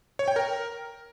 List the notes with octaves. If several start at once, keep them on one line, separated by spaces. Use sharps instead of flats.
C#5
G5
A#4